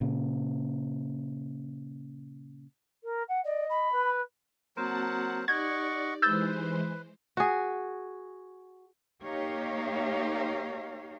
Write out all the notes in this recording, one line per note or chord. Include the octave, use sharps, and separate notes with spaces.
A#2 C#3
A#4
F#5
D5 D#5
B5
B4
F#3 A#3 C4 F#4 A#4 C5 F#5 A5
D#4 G4 D5 D#5 F#5 C#6 G#6
E3 G#3 B4 C5 E6 G6 A6
F#4 G#4
A#3 D#4 G4 C#5 F5